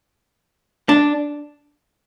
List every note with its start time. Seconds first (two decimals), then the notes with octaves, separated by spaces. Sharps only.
0.89 D4